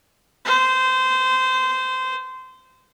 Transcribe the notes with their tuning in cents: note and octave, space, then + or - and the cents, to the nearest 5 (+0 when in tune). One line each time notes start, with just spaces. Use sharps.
C5 -20